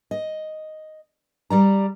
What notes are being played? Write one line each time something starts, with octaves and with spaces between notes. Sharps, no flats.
D#5
G3 D5 A#5